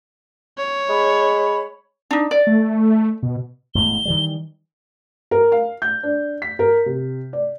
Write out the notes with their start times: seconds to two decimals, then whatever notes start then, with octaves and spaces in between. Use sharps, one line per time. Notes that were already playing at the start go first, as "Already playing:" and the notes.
0.58 C#5
0.89 G#3 B5
2.11 D4 D#4
2.31 D5
2.47 A3
3.23 B2
3.75 E1 A2 G#3 G7
4.05 D#3 E3 G3
5.31 A#4
5.52 F5
5.82 G6
6.03 D4
6.42 B6
6.59 A#4
6.86 C3
7.33 D5